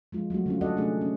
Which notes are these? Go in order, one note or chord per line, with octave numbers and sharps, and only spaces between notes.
F3 G#3 F4
F#3 A3 C4 F#4
D3 C#4 F4
F#4 G#4 A4 D5 D#5 F#5
C3 A3 C#4 D4 G#4
C#4